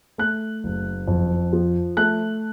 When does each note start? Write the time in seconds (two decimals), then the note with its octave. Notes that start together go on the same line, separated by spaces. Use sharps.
0.18 A3 F#6
0.64 F#1
1.08 F2
1.53 F3
1.97 A3 F#6